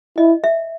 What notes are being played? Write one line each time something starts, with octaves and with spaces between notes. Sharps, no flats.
E4 D#5
E5